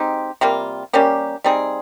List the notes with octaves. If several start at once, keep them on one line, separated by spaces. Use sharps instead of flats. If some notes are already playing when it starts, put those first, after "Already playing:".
Already playing: G#3 C4 D#4 G4
C3 G3 A#3 F4
G3 A#3 C#4 G4
G3 C4 D#4 G#4